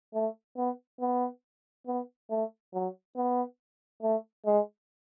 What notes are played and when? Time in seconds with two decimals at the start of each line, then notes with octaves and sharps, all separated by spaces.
0.14 A3
0.57 B3
1.01 B3
1.87 B3
2.30 A3
2.74 F#3
3.16 B3
4.02 A3
4.46 G#3